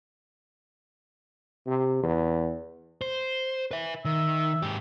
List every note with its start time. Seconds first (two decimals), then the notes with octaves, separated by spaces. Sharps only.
1.67 C3
2.03 E2
3.01 C5
3.71 B4 E5
4.05 D#3 E5
4.62 G#2 G4